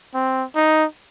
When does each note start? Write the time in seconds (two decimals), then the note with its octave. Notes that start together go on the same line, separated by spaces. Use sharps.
0.14 C4
0.55 D#4